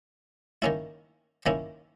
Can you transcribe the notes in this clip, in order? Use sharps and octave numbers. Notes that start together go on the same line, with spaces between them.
D#3 A#3 C#4 E4
D#3 A#3 C#4 E4